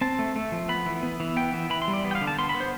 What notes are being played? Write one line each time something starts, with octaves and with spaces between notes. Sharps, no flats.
C4 A5
A3
A3
F3
B3 B5
E3
B3
E3
B3 G5
E3
E3 B5
C6
G3
D5
B3
G5
F5
D3
A5
B3 C6
B5
B3
C5